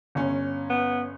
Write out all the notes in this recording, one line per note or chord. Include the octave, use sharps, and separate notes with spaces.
G1 C#4
B3